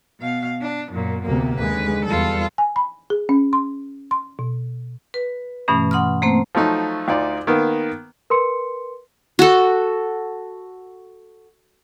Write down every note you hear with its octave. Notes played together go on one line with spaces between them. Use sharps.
B2 F5
D4
F#2 A#2
D2 C3 A#3 B3
D#2 D3 G#3 B4
E2 G3 F4 A4
G#5
B5
G#4
C#4
C6
C6
B2
B4
G2 B2 E3 A3 C#4
F#5 C6 D#6 F6
A3 A#3 C4 C5
F3 F#3 A3 D#4
D2 D#4 F4 D5
D#3 A#3 B3
A#4 B4 C6 C#7
F#4 A4